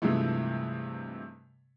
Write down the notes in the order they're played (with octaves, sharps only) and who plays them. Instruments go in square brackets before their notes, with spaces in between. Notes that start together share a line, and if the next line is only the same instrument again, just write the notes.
[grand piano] G2 C3 E3 F3 G#3 A3